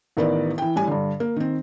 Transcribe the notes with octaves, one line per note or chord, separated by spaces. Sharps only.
A1 D#3 B3 A#4 D5
E3 G5
A2 G3 G#5
G2 D3
A#3
D#3 C4